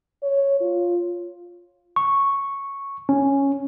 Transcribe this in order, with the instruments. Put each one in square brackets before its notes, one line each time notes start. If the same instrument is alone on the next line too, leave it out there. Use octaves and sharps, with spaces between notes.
[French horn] C#5
F4
[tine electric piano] C#6
C#4